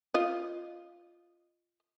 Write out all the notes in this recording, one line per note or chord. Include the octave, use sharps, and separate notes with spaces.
F4 D#5